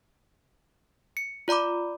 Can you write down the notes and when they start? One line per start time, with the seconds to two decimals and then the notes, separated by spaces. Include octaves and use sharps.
1.17 C#7
1.48 F4 D5 A#5 B5 D6